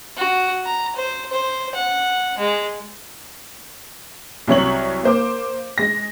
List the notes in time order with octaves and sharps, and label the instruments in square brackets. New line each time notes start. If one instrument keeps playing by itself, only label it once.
[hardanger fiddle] F#4
A#5
C5
C5
F#5
G#3
[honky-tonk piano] C2 F#3 C#5 F#7
A#3 C5 D6
G#3 A#6